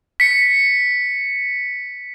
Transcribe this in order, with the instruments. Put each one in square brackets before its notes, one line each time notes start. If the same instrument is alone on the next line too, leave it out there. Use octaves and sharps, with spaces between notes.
[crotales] B6 C#7